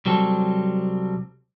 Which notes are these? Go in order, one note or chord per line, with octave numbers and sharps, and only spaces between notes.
C2 F#3 G3 C4 A4